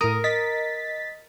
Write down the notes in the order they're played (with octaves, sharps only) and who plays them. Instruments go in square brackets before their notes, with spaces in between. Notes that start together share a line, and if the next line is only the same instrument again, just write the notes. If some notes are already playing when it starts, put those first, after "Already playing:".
[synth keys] A2 D#6 [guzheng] A#4
[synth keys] D#5 A6 B6